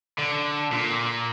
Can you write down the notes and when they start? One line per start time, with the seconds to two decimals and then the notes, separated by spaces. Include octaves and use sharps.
0.18 D3
0.72 A#2